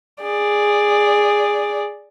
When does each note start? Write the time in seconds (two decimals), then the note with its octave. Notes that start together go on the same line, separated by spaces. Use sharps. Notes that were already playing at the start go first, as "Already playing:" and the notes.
0.22 G#4 D5